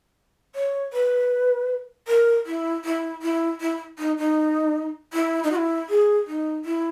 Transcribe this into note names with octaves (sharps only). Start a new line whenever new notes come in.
C#5
B4
A#4
E4
E4
E4
E4
D#4
D#4
E4
D#4
F#4
E4
G#4
D#4
E4